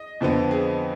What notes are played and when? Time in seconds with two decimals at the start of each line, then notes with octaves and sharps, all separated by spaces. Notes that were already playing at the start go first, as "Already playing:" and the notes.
Already playing: D#5
0.21 F2 D3 F3 B3
0.51 G#4